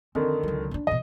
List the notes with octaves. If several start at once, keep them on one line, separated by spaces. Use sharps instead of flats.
F2 D3 D#3 C4
C#2 F#3
C#4 D4
B2 E3 D#5